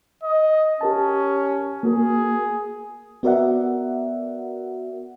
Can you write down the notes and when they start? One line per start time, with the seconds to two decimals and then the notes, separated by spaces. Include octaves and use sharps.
0.24 D#5
0.81 C#4 G4 A#4 A5
1.83 A#3 F#4 G#4 A#4
3.23 B3 F#4 A#4 D5 E5 F#5